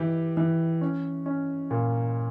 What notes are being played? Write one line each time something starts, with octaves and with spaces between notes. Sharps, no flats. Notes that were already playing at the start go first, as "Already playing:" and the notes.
Already playing: E3 G4
E3
C#4
C#4
A#2